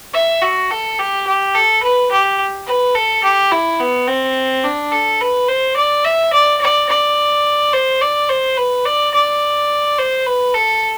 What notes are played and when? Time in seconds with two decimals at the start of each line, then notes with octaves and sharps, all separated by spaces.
0.14 E5
0.42 F#4
0.71 A4
0.99 G4
1.27 G4
1.55 A4
1.83 B4
2.11 G4
2.67 B4
2.95 A4
3.24 G4
3.52 E4
3.80 B3
4.08 C4
4.64 D4
4.92 A4
5.21 B4
5.48 C5
5.76 D5
6.05 E5
6.33 D5
6.61 D5
6.89 D5
7.73 C5
8.01 D5
8.29 C5
8.58 B4
8.85 D5
9.14 D5
9.98 C5
10.26 B4
10.54 A4